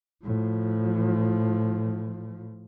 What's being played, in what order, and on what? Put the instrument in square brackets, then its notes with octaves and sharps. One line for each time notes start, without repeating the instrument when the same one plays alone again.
[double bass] A2 F3